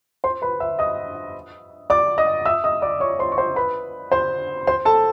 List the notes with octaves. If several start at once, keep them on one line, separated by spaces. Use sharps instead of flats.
C5 C6
B4 B5
E5 E6
D#5 D#6
D5 D6
D#5 D#6
E5 E6
D#5 D#6
D5 D6
C#5 C#6
C5 C6
C#6
C5 C6
B4 B5
C5 C6
C5 C6
A4 A5